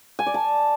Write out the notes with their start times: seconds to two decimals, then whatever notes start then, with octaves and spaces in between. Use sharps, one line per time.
0.19 G#5
0.26 D5
0.34 A5